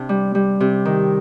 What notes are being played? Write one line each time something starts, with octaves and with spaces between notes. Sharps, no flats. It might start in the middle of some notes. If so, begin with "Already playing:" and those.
Already playing: C3 D4
G3
G3
C3
D#3